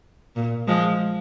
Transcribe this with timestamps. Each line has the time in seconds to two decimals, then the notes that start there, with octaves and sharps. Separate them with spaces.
0.36 A#2
0.67 F3 G#3